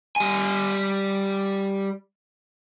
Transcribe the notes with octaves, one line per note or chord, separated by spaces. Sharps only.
G3 G#5